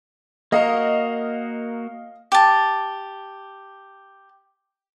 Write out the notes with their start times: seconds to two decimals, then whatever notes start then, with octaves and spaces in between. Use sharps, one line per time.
0.52 A#3 F#4 A#4 D#5 F5
2.32 G4 A5